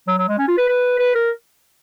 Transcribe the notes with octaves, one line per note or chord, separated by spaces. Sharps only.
F#3
F#3
G#3
C#4
F4
B4
B4
B4
A#4